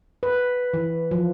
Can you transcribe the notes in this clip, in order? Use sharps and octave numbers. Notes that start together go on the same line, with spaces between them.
B4
E3
F3